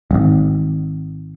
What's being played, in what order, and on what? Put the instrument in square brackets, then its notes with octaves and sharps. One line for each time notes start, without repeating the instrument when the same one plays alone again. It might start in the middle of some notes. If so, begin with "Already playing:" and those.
[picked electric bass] D1 G#1